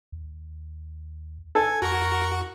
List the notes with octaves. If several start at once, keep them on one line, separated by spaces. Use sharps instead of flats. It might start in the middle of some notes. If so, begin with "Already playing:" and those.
D#2
A4 G#5
F2 F#4 A#4 C#6